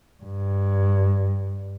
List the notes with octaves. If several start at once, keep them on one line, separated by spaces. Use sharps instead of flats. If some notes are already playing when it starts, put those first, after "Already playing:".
G2